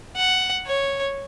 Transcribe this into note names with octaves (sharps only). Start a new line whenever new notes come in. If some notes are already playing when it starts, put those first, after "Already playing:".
F#5
C#5